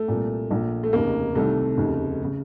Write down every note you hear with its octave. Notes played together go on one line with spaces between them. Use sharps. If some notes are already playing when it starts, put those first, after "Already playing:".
Already playing: A3
C2 A#2
A#1 A#2
A3
F1 D#2 C#3 A#3
C2 C3 D#3 A3
F1 D#2 C#3
C#3